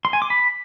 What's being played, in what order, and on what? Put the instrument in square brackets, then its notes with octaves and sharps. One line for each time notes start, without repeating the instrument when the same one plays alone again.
[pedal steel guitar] C6
G#5
D6
B5